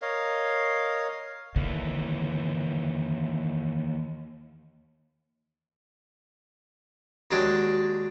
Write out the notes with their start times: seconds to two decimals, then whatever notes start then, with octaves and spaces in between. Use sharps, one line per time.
0.02 A#4 C#5 D#5 F5
1.56 D#2 D3 E3
7.31 D#2 F#3 G#3 D4 G5